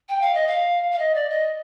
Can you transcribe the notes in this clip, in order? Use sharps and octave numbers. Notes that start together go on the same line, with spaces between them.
G5
F5
D#5
F5
F5
D#5
D5
D#5